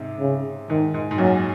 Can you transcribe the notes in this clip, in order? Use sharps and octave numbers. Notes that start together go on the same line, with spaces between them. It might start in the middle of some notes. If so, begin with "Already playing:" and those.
Already playing: G#2 C3
C#3
G#2 D#3
G#2
G#2
F#2 A#2 F#3